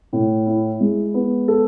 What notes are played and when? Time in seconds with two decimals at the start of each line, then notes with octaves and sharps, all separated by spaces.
0.13 A2
0.46 E4
0.80 G#3
1.14 B3
1.48 A4